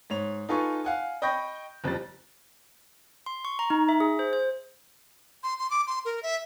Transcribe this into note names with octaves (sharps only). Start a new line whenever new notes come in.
G#2 C#5 F7
D#4 F4 A4 B4 G#5 C#6
F5 F#5 G#5
D#5 G5 B5 C#6 G6 A#6
F#1 F2 G3 A6
C6
C#6
A#5
D#4
E5
G#4
C5
C5
C6
C6
D6
C6
A#4
E5